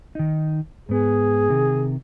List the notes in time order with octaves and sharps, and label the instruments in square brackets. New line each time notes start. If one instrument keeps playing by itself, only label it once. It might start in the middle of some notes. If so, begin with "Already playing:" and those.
[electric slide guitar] D#3 D#4
[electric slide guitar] G#2 B3 [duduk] G#4
[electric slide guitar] C3 D#3